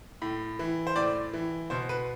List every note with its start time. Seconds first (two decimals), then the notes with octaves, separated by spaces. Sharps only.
0.22 A2
0.59 E3
0.87 C5
0.96 A2 D5
1.33 E3
1.70 B2 C5
1.89 B4